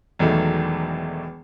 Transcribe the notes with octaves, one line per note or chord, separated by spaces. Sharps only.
E1 E2 D#3 F#3 A3